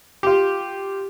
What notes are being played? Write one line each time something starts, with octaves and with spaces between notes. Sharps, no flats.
F4 G4